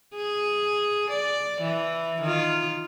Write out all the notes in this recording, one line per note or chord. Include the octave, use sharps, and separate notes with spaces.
G#4
D5
E3
D#3 F4